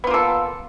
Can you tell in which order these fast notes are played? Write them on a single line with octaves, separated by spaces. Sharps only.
B3 F4 A#3 A4